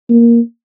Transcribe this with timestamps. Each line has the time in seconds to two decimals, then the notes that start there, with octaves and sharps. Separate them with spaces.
0.10 A#3